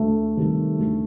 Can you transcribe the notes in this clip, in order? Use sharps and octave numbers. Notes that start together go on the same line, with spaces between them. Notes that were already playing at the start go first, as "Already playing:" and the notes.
Already playing: D2 A3
C3 D#3 G3
D2